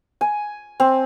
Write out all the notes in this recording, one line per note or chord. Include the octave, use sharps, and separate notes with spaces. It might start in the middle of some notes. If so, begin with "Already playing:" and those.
G#5
C4